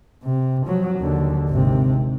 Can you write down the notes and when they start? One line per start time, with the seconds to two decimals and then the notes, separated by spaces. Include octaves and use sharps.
0.23 C3
0.66 F3 F#3
0.99 D#2 D3
1.49 G#1 C3